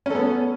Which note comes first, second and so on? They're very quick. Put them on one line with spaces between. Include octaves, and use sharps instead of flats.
C#4 A4 B3